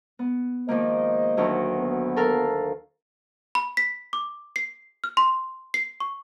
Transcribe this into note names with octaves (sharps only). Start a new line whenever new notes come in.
B3
D#3 F3 G#3 A#3 C5 D#5
D2 D#3 F#3
B3
A4 A#4 F5
B5
B6
D6
C7
F6
C6
C7
C#6